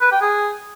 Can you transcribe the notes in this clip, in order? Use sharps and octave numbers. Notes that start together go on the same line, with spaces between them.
B4
G5
G#4